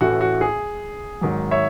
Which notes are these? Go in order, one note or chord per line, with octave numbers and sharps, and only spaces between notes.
A1 A2 E3 A3 F#4
F#4
G#4
G#1 G#2 D#3 F#3
C#5 E5